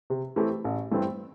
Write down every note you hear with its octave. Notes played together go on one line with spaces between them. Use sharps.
C3
E3 A3 C4 G4
A1
G2 E3 A3 C4